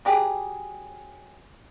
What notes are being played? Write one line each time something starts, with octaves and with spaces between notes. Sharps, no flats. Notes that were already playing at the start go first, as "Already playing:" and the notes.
F#3 G4 G#4